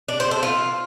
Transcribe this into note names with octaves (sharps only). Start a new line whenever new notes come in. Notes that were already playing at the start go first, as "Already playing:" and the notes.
D4
C5
A4
F4